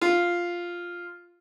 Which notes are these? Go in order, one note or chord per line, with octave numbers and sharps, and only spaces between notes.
F4